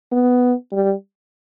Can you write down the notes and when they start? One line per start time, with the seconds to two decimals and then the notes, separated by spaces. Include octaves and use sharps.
0.12 B3
0.72 G3